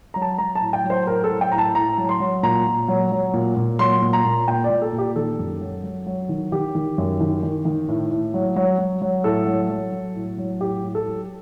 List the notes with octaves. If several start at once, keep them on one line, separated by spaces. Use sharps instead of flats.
F#3 A#5
A5
F#3 A#5
A5
A2
G5
F#3
C5
A2 A#4
A4
F#3
G5
A2 A#5
A5
A2 A#5
F#3
C6
F#3
A#2 A#5
A#2
F#3
F#3
A#2
A#2
F#3 C6
A#2
A#5
A#2
A#2 G5
D5
A#2
A4
A#2
G4
D#3 A4
F#2
F#3
F#3
F#3
D#3
D#3 G4
D#3
F#2
D#3
D#3
D#3
A2
A2
F#3
F#3
F#3
F#3
A2 A4
F#3
F#3
F#3
A2
F#3
A2 G4
A2
A4
F#3